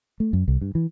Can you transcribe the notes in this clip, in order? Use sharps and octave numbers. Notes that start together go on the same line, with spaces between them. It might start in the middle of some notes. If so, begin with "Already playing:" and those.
A3
F#2
C2
G2
E3